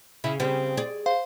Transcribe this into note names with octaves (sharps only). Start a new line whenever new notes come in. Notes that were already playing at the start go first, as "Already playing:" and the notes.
C#3 E4
C#3 G3 C4
G#4 D5
C5 F5